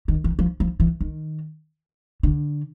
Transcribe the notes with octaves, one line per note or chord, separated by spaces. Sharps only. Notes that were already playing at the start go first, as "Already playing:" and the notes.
D#3
E3
F3
F3
E3
D#3
D3